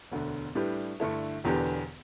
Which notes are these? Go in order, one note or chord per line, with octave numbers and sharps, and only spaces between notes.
E1 D2 D3
A2 G3 D4 G4 B4
G2 D3 A3 E4 A4
E1 E2 D3 B3 G4